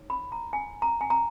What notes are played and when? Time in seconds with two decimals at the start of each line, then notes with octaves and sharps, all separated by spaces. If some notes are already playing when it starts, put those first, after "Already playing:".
Already playing: D#4 C#5
0.10 B5
0.32 A#5
0.53 G#5
0.82 A#5
1.01 G#5
1.10 A#5